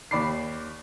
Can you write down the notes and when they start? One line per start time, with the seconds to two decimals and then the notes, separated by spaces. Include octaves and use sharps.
0.11 D#2 D5 B5 D6 C7